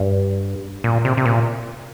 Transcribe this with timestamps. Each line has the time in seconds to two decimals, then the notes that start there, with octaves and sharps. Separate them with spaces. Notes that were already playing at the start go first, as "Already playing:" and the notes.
Already playing: G2
0.84 A#2
1.05 C3
1.17 C3
1.25 A#2